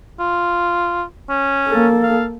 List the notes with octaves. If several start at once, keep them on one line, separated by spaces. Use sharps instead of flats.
F4
C#4
A#3 A4
F5